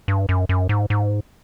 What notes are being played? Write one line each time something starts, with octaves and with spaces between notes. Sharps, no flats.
G2
F#2
F#2
G#2
G#2